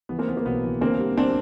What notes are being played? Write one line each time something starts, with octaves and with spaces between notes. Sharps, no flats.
E3 B3
A#3 C4
E3 B3
A#3
B1 B3
E3
D3 A#3 C4
G3
C4 D4